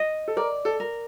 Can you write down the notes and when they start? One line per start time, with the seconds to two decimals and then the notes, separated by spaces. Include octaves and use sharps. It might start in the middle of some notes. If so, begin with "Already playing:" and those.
Already playing: D#5
0.28 A4
0.37 A#4 D5
0.65 A4
0.80 A#4